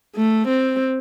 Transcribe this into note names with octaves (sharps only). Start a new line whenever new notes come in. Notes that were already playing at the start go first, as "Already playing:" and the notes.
A3
C4